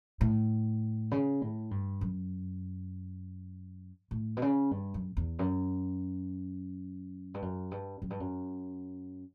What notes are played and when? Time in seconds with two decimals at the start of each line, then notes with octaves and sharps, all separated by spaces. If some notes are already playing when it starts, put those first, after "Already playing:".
0.21 A2
1.11 C#3
1.41 A2
1.71 G2
2.01 F#2
4.11 A2
4.37 B2
4.42 C#3
4.71 G2
4.94 F#2
5.17 E2
5.39 F#2
7.34 G2
7.42 F#2
7.71 G2
8.02 F#2
8.10 G2
8.20 F#2